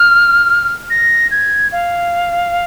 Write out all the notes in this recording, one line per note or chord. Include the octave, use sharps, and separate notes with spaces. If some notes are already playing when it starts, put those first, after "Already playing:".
Already playing: F6
A#6
G#6
F5